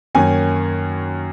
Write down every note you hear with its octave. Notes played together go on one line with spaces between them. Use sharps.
F#2 D#3 A#3 C#4 G#5